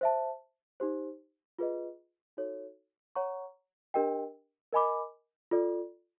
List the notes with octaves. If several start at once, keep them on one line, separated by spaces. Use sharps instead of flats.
C5 E5 A5
D#4 G4 C5
F4 G#4 B4 D#5
D#4 F#4 A4 C#5
C#5 F#5 A#5 C#6
D4 G4 A#4 D#5 G5
A#4 D#5 G#5 B5 D6
F4 A4 D5